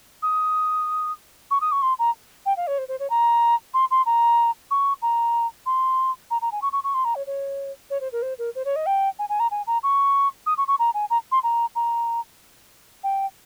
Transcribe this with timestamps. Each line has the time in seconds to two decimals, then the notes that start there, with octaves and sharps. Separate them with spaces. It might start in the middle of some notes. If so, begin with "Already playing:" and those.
0.22 D#6
1.51 C#6
1.61 D#6
1.72 C#6
1.82 C6
1.99 A#5
2.45 G5
2.57 F5
2.67 C#5
2.78 C5
2.88 C5
2.99 C#5
3.10 A#5
3.74 C6
3.91 C6
4.06 A#5
4.71 C#6
5.02 A#5
5.66 C6
6.30 A#5
6.41 A#5
6.52 G#5
6.62 C#6
6.72 C#6
6.84 C#6
6.94 C6
7.04 A#5
7.15 C#5
7.26 C#5
7.90 C#5
8.00 C5
8.12 A#4
8.22 C5
8.38 A#4
8.55 C5
8.65 C#5
8.76 D#5
8.86 G5
9.19 G#5
9.29 G#5
9.40 A#5
9.51 G#5
9.67 A#5
9.83 C#6
10.46 D#6
10.57 C#6
10.68 C#6
10.79 A#5
10.94 G#5
11.10 A#5
11.31 C6
11.43 A#5
11.75 A#5
13.03 G5